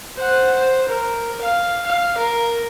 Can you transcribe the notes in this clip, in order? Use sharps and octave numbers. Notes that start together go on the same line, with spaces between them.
C5 F#5
C5
A#4
F5
F5
A#4